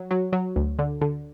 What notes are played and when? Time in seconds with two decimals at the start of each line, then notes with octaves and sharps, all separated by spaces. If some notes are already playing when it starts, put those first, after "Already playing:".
Already playing: F#3
0.11 F#3
0.33 F#3
0.56 D2
0.79 D3
1.01 D3